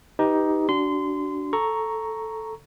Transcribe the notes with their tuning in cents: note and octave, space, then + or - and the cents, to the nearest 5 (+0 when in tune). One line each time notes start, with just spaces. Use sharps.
D#4 +10 G4 +0 B4 +0
D4 -10 F#4 +25 C6 -25
A4 +0 A#5 +0 C#6 +0